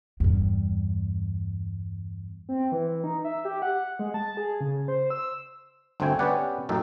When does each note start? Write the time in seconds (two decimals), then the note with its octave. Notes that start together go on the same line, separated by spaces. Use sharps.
0.20 E2 G2
2.49 C4
2.72 E3
3.04 D#4
3.25 E5
3.45 G4
3.62 F#5
3.99 G#3
4.14 A5
4.37 G#4
4.61 C#3
4.88 C5
5.10 E6
6.00 G1 D2 A3 C4 G5 G#5
6.19 B3 C#4 G4 B4 D5 F#5
6.69 A1 F#2 D#4 A4 G5